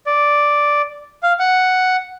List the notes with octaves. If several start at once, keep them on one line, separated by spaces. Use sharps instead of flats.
D5
F5
F#5